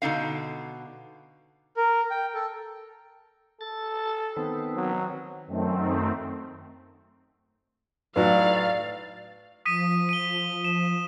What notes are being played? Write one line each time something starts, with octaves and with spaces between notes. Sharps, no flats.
B2 D3 D#4 F5
A#4
G5
A4
A4 A6
D#3 B3 C4
F#3
F#2 D#3 A3 C4
A2 F#3 D#4 B4 D5 F5
F3 D#6 B6 D#7
D#7 G7
E7